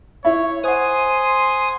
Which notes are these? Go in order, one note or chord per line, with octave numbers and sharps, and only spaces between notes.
E4 C#5
C5 F#5 G#5 C6 D#6